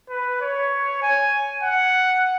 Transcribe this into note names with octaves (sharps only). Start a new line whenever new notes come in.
B4
C#5
G#5
F#5